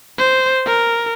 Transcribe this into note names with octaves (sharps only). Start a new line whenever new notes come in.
C5
A#4